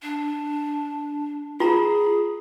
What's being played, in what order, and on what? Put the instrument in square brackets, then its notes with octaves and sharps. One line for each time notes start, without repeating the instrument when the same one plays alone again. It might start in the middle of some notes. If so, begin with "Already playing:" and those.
[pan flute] D4
[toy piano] F4 A#5 [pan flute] G#4